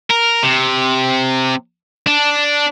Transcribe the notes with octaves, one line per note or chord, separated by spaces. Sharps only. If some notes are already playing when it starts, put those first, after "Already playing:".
A#4
C3
D4